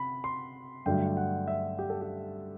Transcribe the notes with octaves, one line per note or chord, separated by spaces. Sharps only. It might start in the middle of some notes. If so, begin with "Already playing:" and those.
Already playing: C3 B5
C6
G2 D3 F#3 A3 G5
F#5
E5
G4
A4
G4